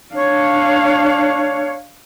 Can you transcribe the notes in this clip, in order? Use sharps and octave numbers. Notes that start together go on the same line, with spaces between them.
D4 C#5 F5